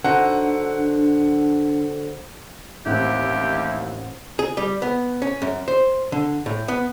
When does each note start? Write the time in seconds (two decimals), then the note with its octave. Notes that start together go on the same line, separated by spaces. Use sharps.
0.04 D3 D4 D#4 F#4 A4 C5 F#5
2.86 A1 D#2 C4 E4 G4 F#6
4.39 G#4
4.57 G3
4.82 B3
5.22 C#4
5.42 F#2
5.68 C5
6.12 D3
6.46 A2
6.68 B3